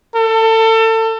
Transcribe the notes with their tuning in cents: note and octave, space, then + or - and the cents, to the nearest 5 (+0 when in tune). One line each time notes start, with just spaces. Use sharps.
A4 +30